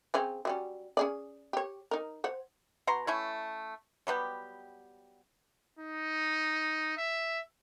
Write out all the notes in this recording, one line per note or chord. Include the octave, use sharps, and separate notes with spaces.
C#3 C4 C#4
F#3 G3 C#4
C#4 G#4 D5
G4 C#5
D#4 A#4
C5 C#5 F#5
B2 F#4 A#5 C6
A3 C#4 E4
F#3 G3 B3 G4
D#4
E5